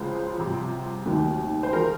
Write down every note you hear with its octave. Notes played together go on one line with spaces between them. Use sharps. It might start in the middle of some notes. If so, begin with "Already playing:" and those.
Already playing: C#2 C#3 F3 G#3 C5
C2 C3 F3
F1 D#2 D#3 F#3
C5
F3 G#3 A#4